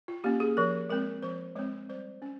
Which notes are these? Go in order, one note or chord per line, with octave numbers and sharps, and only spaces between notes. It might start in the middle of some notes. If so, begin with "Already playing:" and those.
F4
A#3 C#4 G4
G#4
F3 A#4
G#3 C4 A#4
F3 C5
G#3 C4 C#5
G3 C5
C#4